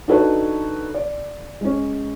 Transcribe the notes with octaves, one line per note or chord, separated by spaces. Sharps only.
D4 D#4 F#4 A4 B4 C#5
D5
G#3 C#4